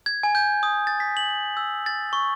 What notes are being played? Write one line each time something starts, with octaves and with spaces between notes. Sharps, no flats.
G#6
G#5
G6
D#6
A6
B6
F#7
E6
A6
C#6